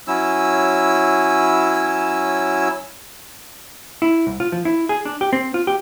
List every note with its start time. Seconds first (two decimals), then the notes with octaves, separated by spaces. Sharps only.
0.07 F#3 C#4 E4 E6
4.02 E4
4.27 C2
4.40 F4
4.52 F3
4.65 E4
4.89 G#4
5.05 D4
5.21 G4
5.33 C4
5.54 F4
5.67 G4